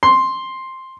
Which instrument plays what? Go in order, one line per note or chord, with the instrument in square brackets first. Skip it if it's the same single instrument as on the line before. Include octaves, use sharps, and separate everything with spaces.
[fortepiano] C6